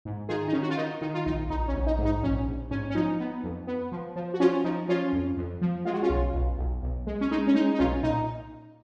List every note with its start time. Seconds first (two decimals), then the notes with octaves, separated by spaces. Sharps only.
0.05 G#2
0.29 D#3 F4 G#4
0.48 D#4
0.53 D#3 C#4
0.63 F#4
0.70 F4
0.77 D#3 D#4
1.01 D#3 D#4
1.14 F4
1.26 A#1 D#4
1.50 A#1 D#4
1.68 C#4
1.74 A#1
1.87 D#4
1.98 G#2
2.05 D#4
2.23 A#1 C#4
2.47 A#1
2.71 G#2 C#4
2.90 C#4
2.95 F3 D#4
3.20 B3
3.44 F2
3.67 B3
3.92 F3
4.16 F3
4.34 F#4
4.40 F3 C#4 F4
4.64 F3 D#4
4.88 F3 C#4 F4
5.13 F2
5.37 F2
5.61 F3
5.85 G#3 F4
5.94 F#4
6.02 C#4 F4
6.09 B1
6.34 B1
6.58 B1
6.82 B1
7.07 G#3
7.21 C#4
7.31 G#3 D#4
7.47 C#4
7.54 G#3 D#4
7.74 D#4
7.79 B1 C#4 F4
8.03 A#2 D#4